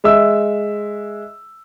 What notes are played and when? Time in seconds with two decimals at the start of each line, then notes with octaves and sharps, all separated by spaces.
0.04 G#3 E5 E6